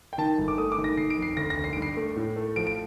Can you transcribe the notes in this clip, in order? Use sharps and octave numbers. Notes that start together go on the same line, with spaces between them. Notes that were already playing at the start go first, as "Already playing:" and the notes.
G5
D#3 A5
G1
D6
A3 D#6
D6
D#3
A#6
D#3 C7
D7
F2 C7
D2 A#6
A#6
D2
C7
G2 D7
C7
A3
A2
A3
F3 D7
D7